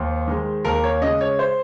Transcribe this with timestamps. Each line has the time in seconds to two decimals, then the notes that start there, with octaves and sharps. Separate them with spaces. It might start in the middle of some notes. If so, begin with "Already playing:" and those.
Already playing: D#2 C5
0.27 D#3 G#3
0.65 D#2 A#4
0.84 C#5
1.01 C#3 G#3 D#5
1.21 C#5
1.39 C5